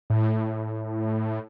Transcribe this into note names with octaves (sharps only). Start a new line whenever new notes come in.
A2